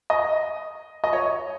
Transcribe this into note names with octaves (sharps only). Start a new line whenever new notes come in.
D#5
D#5
C#5